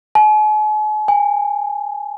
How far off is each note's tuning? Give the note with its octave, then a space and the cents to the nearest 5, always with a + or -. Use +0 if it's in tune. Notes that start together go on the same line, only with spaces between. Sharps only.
G#5 +45
G#5 -30